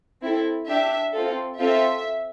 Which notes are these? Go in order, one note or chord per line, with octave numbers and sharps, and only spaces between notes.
C4 E4 A4
D4 G4 E5
C4 F4 A4
C4 F4 A4 E5